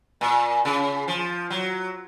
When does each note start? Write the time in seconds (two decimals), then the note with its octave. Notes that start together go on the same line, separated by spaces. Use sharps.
0.21 A#2
0.65 C#3
1.08 F3
1.50 F#3